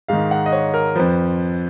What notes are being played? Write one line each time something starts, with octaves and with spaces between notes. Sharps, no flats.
G#2 D#3 F5
F#5
D#5
C#5
A#4
F2 F3 B4